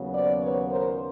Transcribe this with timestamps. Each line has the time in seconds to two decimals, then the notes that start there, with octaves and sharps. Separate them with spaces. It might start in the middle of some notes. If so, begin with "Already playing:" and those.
Already playing: D#2 C#3 F#3 B3
0.14 C5 D5
0.42 B4 C#5
0.71 A#4 C5